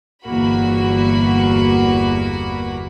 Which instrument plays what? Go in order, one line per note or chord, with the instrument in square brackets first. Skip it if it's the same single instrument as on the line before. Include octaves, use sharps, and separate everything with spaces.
[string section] G1 E2 A#3 F#4 B5